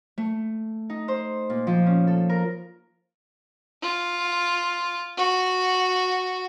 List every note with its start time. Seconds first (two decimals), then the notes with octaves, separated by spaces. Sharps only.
0.18 A3
0.90 D#4
1.08 C5
1.50 A#2
1.67 F3
1.86 C#4
2.07 A4
2.29 A#4
3.82 F4
5.17 F#4